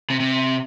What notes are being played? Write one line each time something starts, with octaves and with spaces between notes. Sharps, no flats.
C3
C3